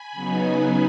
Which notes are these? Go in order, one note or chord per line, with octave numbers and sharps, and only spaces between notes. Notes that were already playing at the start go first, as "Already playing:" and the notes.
Already playing: G#5 B5
C#3 F#3 B3 D#4